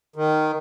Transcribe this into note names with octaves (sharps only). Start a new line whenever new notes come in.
D#3